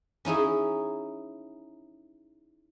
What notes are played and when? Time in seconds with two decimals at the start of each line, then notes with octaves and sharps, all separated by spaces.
0.25 C#4 D#4 E4 G#4